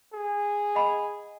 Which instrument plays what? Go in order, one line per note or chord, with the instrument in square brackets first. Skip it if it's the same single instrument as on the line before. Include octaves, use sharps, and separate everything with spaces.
[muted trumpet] G#4
[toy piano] D#5 F#5 B5